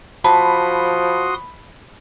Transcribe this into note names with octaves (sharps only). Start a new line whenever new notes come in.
F3 F#4 A5 B5 C6 D#6